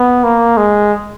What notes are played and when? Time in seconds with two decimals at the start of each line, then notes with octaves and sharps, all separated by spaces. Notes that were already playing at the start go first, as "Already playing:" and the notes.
Already playing: B3
0.24 A#3
0.57 G#3